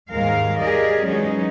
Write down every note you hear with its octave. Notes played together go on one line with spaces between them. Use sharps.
D#2 G#2 G#3 A#4 F5
G4 G#4 A#4 D5 D#5
E3 F#3 G#3 C#4 D#4